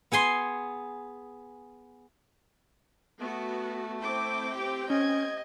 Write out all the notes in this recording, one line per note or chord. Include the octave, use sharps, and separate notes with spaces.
B3 G#4 G#5 C6
A3 B3 F#4
C4 E4 G5 D6
G4
C#4 D#5 G#6